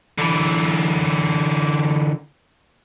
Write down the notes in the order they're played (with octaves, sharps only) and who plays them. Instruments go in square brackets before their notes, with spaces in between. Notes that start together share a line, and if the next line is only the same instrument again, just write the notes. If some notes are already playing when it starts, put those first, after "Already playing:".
[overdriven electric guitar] D3 E3